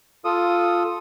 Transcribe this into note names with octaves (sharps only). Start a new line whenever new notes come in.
F4 A4 D#6